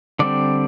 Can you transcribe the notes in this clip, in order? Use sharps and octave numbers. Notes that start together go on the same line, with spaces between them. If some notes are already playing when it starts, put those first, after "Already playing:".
D3 G3 C4 D5